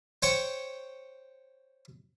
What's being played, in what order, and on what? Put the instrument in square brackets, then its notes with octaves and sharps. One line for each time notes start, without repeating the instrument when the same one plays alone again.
[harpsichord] C5 C#5 G5 C#6